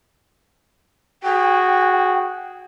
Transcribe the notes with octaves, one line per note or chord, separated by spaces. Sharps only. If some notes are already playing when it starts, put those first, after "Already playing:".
F#4 G#4 G5